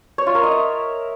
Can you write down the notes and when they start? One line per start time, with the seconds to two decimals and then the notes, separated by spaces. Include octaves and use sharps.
0.18 C#5
0.27 F4
0.35 A#4
0.43 D#5
0.52 E5